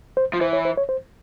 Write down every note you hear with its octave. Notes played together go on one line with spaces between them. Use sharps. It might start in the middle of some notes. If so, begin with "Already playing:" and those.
C5
F3
E3 C5
C#5
C5
C#5
C5